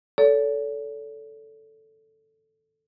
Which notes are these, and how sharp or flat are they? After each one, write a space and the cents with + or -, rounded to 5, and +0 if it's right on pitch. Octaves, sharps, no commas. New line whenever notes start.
A4 +0 C#5 +45